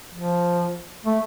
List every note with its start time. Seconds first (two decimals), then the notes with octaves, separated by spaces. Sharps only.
0.15 F3
1.05 A3